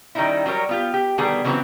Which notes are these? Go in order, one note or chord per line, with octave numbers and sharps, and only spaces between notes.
D#3 G3 C#4 D#4 E4
F#3 G3 D4 A#4 C#5
B3 F4 G4
G4
B2 D3 D#3 G3 B3 G#4
C#3 E3 F#3 A3 B3 C4